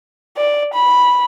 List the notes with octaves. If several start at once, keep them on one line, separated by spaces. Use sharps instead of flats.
D5
B5